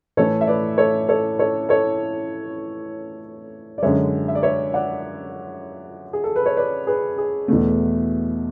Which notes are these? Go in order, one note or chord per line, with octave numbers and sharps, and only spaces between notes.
A2 E3 A3 A4 C#5
E5
B4 D5
A4 C#5
A4 C#5
A4 C#5
A4 C#5
D5
F#2 D3 G#3 C#5 E5
E5
D5
C#5 E5
D5 F#5
G#4
A4
B4
C#5
B4 D5
G#4 B4
G#4
E2 B2 A3